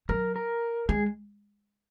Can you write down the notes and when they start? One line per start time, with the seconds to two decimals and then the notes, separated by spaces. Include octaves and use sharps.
0.09 F#3 A#4
0.36 A#4
0.89 G#3 G#4